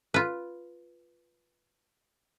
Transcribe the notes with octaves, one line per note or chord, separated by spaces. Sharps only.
F4 B4